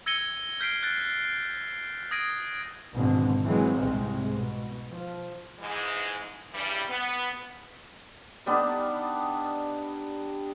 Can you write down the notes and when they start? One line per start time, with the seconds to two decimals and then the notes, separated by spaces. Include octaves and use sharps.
0.06 E6 G#6 A#6 C#7 D#7 G7
0.60 F6 G6 B6 C7 D7
0.83 F#6 G6 A6 C7 D7
2.11 D#6 G#6 A#6 D7 D#7
2.94 G#1 B2 D3 G#3
3.45 E3 F#3 G#3 C4
3.77 C2 G#2 C3 G#3
4.35 B2
4.91 F3
5.59 G#2 E3 G#3
6.54 G2 C#3 E3 G3
6.88 B3
8.46 G3 B3 D4 D#4